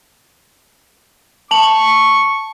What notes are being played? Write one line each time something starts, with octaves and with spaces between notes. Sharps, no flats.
A5 C#6 F7 F#7